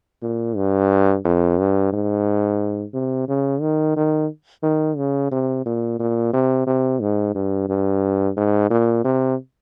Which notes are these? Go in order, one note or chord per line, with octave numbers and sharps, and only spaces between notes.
A#2
G2
F2
G2
G#2
C3
C#3
D#3
D#3
D#3
C#3
C3
A#2
A#2
C3
C3
G#2
G2
G2
G#2
A#2
C3